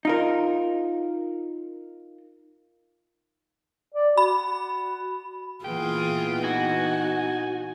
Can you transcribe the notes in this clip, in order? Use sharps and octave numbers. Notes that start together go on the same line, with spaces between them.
D#4 F4 A#4
D5
F#4 B5
A#2 E3 A#3 B3 F4 G#4 G5
D#4 F#4 G#5